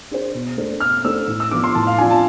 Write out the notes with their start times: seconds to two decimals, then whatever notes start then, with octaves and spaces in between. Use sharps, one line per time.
0.11 D4 G#4 C5
0.34 B2
0.57 A3 D4 A4 C5
0.80 B2 F6
1.04 A3 D4 A4 C5 E6
1.27 A2
1.40 E6
1.51 F3 B3 D4 F4 D6
1.64 C6
1.75 A2 A5
1.87 F5
1.98 F3 B3 D4 F4 G#5
2.11 A5